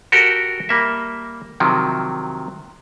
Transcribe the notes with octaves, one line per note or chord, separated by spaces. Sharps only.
F#4 G4 A4 A#4 G5
G3 A#3 E5
C3 D#3 F3 F#3